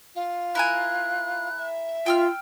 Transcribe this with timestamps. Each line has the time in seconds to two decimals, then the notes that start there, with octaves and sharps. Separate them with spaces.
0.14 F4
0.55 E4 A#4 G#5 F#6
1.56 E5
2.06 F4 G5 E6 F6